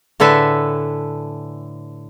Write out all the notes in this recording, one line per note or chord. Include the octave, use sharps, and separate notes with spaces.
A2 D3 A4 B4 G#5